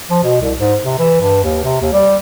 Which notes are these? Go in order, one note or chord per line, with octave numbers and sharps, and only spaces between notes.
F3
B2
C2
G#2
C3
E3
G2
D#2
C3
D#2
G3